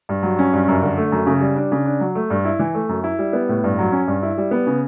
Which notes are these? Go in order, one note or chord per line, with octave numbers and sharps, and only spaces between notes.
G2
F#3
C#4
G2
F#2
D3
A3
F#2
C#3
G3
D4
C#3
D4
F#3
A3
G2
E4
E3
A3
F#2
E4
G3
B3
A2
G2
F#3
C#4
G2
E4
G3
B3
C#3